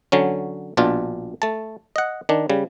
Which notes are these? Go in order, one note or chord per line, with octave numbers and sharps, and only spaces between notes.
D3 F#3 C#4
A#1 B2 D4 F4
A3 A5
D#5 F#5
D#3 D4
C#3 G3